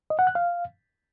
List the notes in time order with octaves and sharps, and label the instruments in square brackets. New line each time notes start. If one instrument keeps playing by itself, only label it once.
[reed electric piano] D#5
F#5
F#6
F5